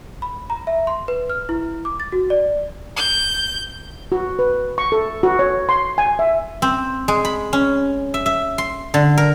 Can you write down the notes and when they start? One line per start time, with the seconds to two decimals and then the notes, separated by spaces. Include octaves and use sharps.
0.22 B5
0.50 A#5
0.67 E5
0.87 C6
1.08 B4
1.30 F6
1.49 E4
1.85 D6
2.00 A6
2.12 F#4
2.30 D5
2.97 G6
4.12 F#4
4.39 B4
4.78 C#6
4.92 A4
5.23 F#4
5.39 C#5
5.69 C6
5.98 G#5
6.19 E5
6.62 C4
7.08 G#3
7.25 B5
7.53 C#4
8.14 E5
8.26 E5
8.58 C6
8.94 D3
9.18 A#4